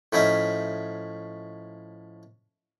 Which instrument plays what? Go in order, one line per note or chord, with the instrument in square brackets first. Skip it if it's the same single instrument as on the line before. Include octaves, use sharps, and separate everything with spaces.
[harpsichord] A2 F3 C#4 D#4 E5